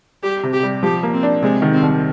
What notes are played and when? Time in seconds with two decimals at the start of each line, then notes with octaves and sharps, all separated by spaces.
0.23 G3 G4
0.43 C3
0.53 G4
0.63 G3
0.83 F3 G4
1.03 A#3
1.13 C4
1.23 D4
1.42 C3 G#3
1.62 D#3
1.73 C4
1.83 C2